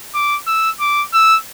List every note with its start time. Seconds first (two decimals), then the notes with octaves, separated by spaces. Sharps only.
0.14 D6
0.47 E6
0.80 D6
1.13 E6